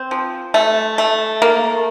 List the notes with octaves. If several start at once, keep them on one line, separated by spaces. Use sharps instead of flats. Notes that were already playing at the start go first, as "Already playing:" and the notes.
Already playing: C4
F3
A3
A3
A#3